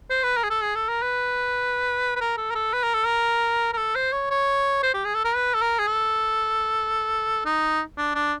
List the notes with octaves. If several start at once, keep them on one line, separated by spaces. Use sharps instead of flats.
C5
B4
A#4
G#4
A4
G#4
A4
A#4
B4
B4
A#4
A4
A#4
A4
B4
A#4
A4
A#4
A#4
A4
C5
C#5
C#5
C5
G4
G#4
A4
A#4
B4
A4
A#4
G#4
A4
D#4
D4
D4